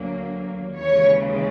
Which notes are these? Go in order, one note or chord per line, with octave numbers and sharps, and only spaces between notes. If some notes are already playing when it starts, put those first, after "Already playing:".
Already playing: D2 D3 F#3 A#3
D#2 C#3 E3 G#3 C#5